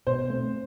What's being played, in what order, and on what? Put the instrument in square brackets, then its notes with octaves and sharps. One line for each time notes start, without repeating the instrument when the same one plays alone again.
[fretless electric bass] B2 [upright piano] C5
[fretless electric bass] A3 C4